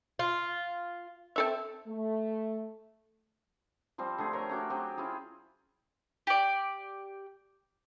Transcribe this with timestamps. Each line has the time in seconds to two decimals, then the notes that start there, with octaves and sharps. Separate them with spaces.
0.19 F4
1.36 C4 A4 E5
1.87 A3
3.98 F3 G3 C4 C5
4.18 D3 A3 G#4
4.33 A#4 C#5
4.49 A3 C#4 F#4 D6
4.70 F#3 C4 G4 G#4
4.97 C#4 E4 F4 G#4
6.27 G4 D5